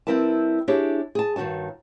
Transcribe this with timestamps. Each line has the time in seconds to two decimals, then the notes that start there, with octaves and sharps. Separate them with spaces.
0.07 G3 C4 E4 A#4 B4 A5
0.68 D4 E4 G4 G#4 C#5
1.15 G#4 A5
1.36 G2 D#3 F#4 C#5 A5